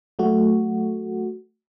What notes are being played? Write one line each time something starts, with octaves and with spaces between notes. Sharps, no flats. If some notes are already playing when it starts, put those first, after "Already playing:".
F#3 A3 F#4